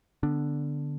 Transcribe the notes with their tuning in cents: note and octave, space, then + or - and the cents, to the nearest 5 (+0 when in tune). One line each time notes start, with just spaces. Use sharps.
D3 +0 B3 +0 D4 +0